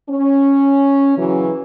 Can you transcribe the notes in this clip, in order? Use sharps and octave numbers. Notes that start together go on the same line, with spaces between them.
C#4
C#3 E3 F#3